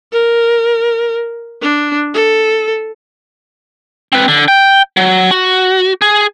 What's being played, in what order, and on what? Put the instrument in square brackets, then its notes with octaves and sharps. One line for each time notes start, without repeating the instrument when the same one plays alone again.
[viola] A#4
D4
A4
[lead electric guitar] C4 B4
D3
G5
F#3
F#4
G#4